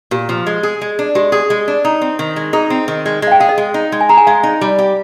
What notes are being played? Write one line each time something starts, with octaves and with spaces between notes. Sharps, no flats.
A#2 G4
F3
G#3
G#4
G#3
D4
G#3 G4
G#4
G#3
D4
D#4
C4
D#3
G#3
D#4 G#4
C4
D#3
G#3
G#3
F5
G5
G#4 F5
D#5
G#3
D#4
G#3
G#5
G#4 A#5
G#5
G#3 F5
D#4
G3
G4